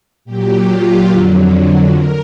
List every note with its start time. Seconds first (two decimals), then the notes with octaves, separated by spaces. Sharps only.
0.25 A#2 F#3 G4
0.67 F4
1.09 F2 D3 F#3
1.93 A#4